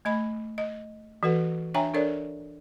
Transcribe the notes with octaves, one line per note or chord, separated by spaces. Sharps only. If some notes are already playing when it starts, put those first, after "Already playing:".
A3 D#5 B5
D#5
E3 F#4 A4 B4 F#5
D4 C#5 E5 G5 G#5 A#5
D4 A4 A#4 C#5 D5